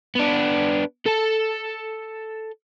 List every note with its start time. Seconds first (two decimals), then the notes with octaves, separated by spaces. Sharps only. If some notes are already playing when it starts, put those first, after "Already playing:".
0.15 B3 D4
1.06 A4 A5